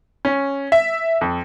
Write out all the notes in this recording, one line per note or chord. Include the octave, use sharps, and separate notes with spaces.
C#4
E5
F2